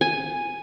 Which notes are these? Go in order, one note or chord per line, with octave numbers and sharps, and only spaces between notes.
G#5